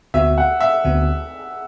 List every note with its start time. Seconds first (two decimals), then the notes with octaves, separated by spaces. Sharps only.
0.14 D2 D3 B3 F#4 E5
0.38 F#5
0.61 E5
0.84 D2 D3 B3 F#4